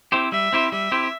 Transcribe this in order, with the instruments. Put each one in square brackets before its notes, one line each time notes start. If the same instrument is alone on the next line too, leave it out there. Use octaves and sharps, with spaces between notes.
[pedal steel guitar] C4 E4 G4 C5
[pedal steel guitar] G3 [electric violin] E5
[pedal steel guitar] C4 E4 G4 C5
[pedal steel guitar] G3 [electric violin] E5
[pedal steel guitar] C4 E4 G4 C5